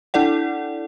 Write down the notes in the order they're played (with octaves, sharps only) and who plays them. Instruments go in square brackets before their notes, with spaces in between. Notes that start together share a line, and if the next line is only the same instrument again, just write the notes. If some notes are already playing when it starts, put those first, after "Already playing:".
[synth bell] D4 E4 A4 D5 F#5